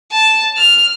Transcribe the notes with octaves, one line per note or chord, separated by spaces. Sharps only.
A5
F6